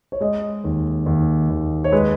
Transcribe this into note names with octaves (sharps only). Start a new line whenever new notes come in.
C#5
G#3 D#5
D#2
D#2
D#2
C#5
G#3 B4